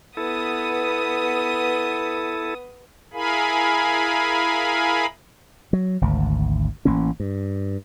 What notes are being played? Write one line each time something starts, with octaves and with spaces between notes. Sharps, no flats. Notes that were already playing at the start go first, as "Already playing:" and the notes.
B3 E4 A4 D#6
E4 G#4 A#4 F5 G#5 B5
F#3
G#1 D2
A1 E3 A#3 C#4
G2